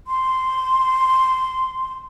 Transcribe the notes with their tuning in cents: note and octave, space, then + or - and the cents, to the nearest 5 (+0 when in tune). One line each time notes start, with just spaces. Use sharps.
C6 -10